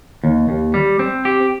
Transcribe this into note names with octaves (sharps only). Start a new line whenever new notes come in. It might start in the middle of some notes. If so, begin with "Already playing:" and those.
D#2
D#2
G3
C4
G4